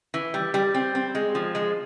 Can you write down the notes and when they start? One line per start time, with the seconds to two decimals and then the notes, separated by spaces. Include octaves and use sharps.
0.14 E3
0.34 G3
0.54 G3
0.75 C4
0.95 C4
1.15 G#3
1.35 F3
1.55 G#3